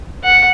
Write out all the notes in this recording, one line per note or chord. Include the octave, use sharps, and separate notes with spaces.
F#5